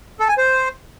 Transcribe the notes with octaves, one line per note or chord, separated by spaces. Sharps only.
A4
G#5
C5